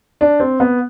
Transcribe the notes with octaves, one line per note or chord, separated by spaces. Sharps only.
D4
C4
B3